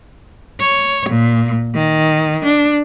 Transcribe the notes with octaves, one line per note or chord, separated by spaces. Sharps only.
C#5
A#2
D#3
D4